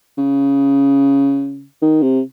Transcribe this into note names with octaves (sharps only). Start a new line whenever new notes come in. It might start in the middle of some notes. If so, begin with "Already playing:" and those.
C#3
D#3
C3